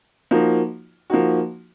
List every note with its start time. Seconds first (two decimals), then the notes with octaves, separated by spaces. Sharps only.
0.31 F3 A#3 D#4 F#4
1.10 F3 A#3 D#4 F#4